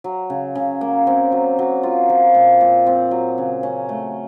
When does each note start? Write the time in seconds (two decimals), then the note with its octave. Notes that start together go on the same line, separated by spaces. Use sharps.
0.04 F#3
0.30 C#3
0.55 C#3
0.81 A#3
1.07 C4
1.32 F#3
1.59 F#3
1.83 F4
2.09 F3
2.35 A#2
2.61 A#2
2.87 C4
3.11 F#3
3.38 C#3
3.63 C#4
3.89 A3